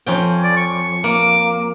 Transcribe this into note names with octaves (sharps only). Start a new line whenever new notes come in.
F2 C#4 G5
D5
C#6
A#3 D6